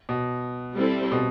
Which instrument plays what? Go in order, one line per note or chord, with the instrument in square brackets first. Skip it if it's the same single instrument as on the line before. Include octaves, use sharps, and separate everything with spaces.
[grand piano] B2
[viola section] G3 C4 E4 A4
[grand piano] B2